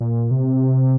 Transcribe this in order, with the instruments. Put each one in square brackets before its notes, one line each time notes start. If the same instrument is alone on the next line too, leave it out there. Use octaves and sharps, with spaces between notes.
[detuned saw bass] A#2
C3